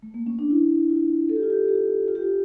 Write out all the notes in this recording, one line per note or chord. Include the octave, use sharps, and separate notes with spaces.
A3
A#3
C#4
D4
E4
F4
A4
G4
F4
G4
G4
F4
G4
F4